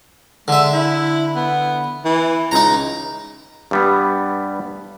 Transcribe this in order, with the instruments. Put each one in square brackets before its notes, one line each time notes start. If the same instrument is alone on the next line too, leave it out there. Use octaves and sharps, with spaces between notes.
[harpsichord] D3 E5 [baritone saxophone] G#3
[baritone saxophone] E4
B3
E3
[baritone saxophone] C#2 [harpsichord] D#4 A#5
[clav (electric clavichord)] G2 G3 B3